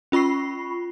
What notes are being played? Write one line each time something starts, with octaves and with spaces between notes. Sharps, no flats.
C#4 F4 B5 C#6 C7